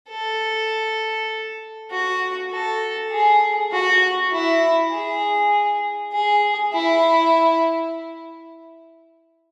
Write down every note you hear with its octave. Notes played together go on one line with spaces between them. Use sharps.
A4
F#4
A4
G#4
F#4
E4
G#4
G#4
E4